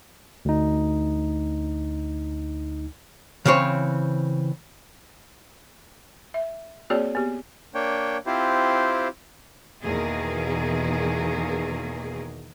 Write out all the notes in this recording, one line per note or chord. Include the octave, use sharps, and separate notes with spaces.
D2 D#4
C#3 E3 C4 C5 C#5
E5
A#3 C4 F#4 G#4 C#5 D5
B3 G4
A#3 D4 C#5 G5
C4 E4 F4 G4 C5
E2 B2 D#3 A#3 G#4